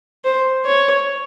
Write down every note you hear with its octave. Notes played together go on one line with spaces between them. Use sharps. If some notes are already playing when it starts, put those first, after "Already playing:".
C5
C#5